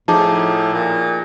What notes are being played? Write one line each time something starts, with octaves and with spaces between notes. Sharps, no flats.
A2 F3 D#4 G#4 A5 D6
A#2